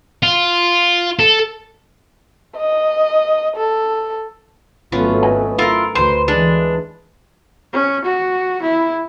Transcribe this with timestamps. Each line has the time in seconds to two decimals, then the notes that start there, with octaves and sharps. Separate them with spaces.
0.23 F4
1.19 A4
2.57 D#5
3.56 A4
4.92 G#1 F#3 A3 B3 C#4 F4
5.22 B4 D#5 G#5
5.59 E4 F4 A4 A#4
5.95 D2 B4 C5
6.28 E3 G#3 D4
7.73 C#4
8.04 F#4
8.62 E4